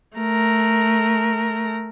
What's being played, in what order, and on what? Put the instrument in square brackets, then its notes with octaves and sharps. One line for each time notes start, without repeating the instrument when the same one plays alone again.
[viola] A3 A#4